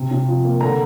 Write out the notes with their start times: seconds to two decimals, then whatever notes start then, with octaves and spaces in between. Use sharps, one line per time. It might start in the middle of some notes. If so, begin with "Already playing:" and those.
Already playing: C3
0.11 C3
0.27 F3
0.45 A#3
0.61 D3 A#5